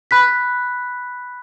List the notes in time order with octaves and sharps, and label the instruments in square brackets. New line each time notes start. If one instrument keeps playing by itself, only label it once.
[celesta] B5 F#6 B6